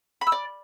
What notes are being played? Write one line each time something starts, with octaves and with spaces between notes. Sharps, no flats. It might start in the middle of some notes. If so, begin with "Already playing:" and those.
B5
E6
D5